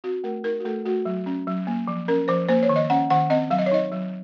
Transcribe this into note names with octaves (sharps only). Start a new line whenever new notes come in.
C4 F#4
A3 A#4
D#4 A#4
F#4
A3 A4
A3 F#4
F#3
C#4
F#3
A#3
F3
C#4 A#4
F3 C5
A#3 C5
C#5
D#3
D#5
C#4 F#5
D#3 F#5
C4 D#5
F#3 F5
D#5
C#5
D#4 D#5
F#3